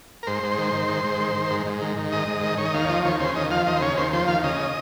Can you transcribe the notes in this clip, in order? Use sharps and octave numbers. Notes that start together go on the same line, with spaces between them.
A#4
G#2 C5
G#2
D#3
D#3
G#2
G#2
D#3
D#3
G#2
G#2
D#3
D#3
G#2 D#5
G#2
D#3
D#3 C#5
D#5
D#2 F5
C#5
F3 D#5
D#2 C#5
C#3 C5
D#2 D#5
F3 F5
D#2 D#5
C5
C#3 C#5
D#2 C5
F3 C5
D#2 F5
C#3 D#5